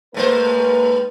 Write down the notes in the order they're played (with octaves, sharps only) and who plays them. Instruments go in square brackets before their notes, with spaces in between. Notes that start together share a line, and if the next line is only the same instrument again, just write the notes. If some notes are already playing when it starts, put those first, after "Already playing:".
[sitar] A2 G#3 C5 [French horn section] A#3 D#4 B4